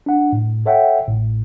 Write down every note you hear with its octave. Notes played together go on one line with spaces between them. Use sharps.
D4 F#5
A2
A4 C#5 E5 F#5 G5
A1 A2